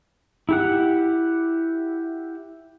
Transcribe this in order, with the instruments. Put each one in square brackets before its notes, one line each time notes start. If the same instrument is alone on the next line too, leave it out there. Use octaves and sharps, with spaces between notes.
[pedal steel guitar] E4 G4 F#5